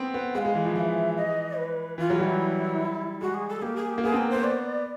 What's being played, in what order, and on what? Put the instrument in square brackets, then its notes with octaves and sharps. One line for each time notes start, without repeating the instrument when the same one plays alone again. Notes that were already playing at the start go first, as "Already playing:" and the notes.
Already playing: [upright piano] B3 C4
B3
[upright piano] G#3 [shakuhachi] F#5
[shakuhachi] F5
[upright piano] G#3
E3
F3
[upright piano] E3 [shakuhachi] F5
[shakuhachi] E5
D#5
B4
[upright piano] E3 [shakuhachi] F4
[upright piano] F#3
[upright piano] G3 [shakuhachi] E4 F4
[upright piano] G#3 [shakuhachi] F#4
[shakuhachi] G#4
A4
[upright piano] A#3 [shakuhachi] G4
[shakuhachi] G#4
G4
[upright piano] A#3
[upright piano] B3 [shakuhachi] G#4
[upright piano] C4 [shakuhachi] A#4
[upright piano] B3 [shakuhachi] C5
[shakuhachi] D5